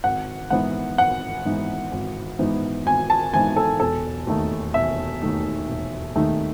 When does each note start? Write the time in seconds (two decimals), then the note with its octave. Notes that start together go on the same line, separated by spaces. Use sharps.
0.04 G#1 F#5
0.50 G#2 E3 B3 D#4 F#5
0.98 G#1 F#5
1.45 G#2 E3 B3 D#4
1.92 G#1
2.39 G#2 E3 B3 D#4
2.86 G#1 G#5
3.10 A5
3.34 G#2 E3 B3 D#4 G#5
3.56 A4
3.80 E1 A4
4.27 D#2 D#3 A3 D#4
4.74 E1 E5
5.22 D#2 D#3 A3 D#4
5.68 E1
6.15 D#2 D#3 A3 D#4